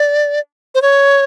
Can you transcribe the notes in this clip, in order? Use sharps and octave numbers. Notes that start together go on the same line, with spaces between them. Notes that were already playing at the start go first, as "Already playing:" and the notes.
Already playing: D5
C5
C#5